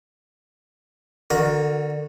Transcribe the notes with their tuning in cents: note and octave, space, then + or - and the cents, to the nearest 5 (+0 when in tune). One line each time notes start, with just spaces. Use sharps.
D3 +20 F#4 -20 A#4 +0